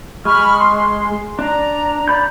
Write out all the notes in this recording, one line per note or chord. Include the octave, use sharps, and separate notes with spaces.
G#3 B5 C#6 F6
C6
D4 A#5
D5 B5 G6